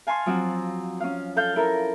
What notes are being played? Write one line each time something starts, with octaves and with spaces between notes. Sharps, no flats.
F5 G#5 A5 C6 C#6 F6
F3 F#3 C4 F#4
C#4 F5
A4 F5 G6
E4 A4 A#4